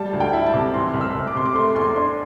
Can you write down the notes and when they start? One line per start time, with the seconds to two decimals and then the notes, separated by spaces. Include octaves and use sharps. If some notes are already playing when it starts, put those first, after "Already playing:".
Already playing: G3 A5
0.13 D2
0.20 G5
0.33 E4
0.46 A5
0.53 C3
0.74 E3 C6
0.94 C2
1.01 E6
1.14 C2
1.27 D6
1.35 C3 C6
1.46 D6
1.55 A3 C6
1.75 E2 C6
1.96 D4 C6